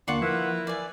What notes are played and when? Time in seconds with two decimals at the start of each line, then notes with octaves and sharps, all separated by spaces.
0.08 D#2 D3 A#3 D4 F4 F#5 C#6
0.22 F3 E4 A#4 B4
0.67 D5 G#5